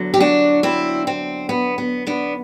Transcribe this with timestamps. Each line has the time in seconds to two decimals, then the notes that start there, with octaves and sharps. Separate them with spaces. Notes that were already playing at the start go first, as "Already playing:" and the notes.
Already playing: E2 D3 F#3
0.14 G4
0.20 D4 F#4
0.63 C4 E4
1.07 C4
1.49 B3
1.78 B3
2.07 B3 D4